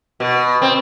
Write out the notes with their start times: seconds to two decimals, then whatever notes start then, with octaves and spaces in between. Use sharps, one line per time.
0.20 B2
0.62 C4